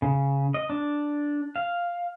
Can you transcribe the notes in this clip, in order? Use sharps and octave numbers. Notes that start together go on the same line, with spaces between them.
C#3
D#5
D4
F5